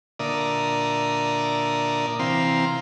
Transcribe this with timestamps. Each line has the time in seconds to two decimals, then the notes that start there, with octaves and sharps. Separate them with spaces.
0.19 A#2 D3 A#4 D5 E5 D#6
2.19 C3 E3 C4 F5 A#5 C6